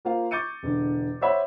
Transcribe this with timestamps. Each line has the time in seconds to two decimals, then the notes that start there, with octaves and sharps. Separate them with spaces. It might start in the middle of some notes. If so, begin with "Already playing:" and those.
0.05 A#3 F4 C5 F5
0.31 C#6 D6 G6 A6 C#7 D#7
0.63 E1 D3
1.21 C5 C#5 E5 F#5 B5